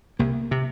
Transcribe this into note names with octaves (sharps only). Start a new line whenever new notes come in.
C2 A#3
C3